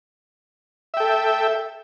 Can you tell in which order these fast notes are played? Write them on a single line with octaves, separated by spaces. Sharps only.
E5 G5 A4